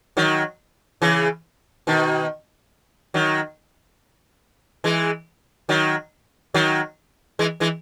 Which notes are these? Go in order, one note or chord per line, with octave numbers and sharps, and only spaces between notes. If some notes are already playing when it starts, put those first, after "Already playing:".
D#3 F#3
C#3 E3
B2 D#3
D#3 F#3
E3 G#3
D#3 F#3
D#3 F#3
E3 G#3
E3 G#3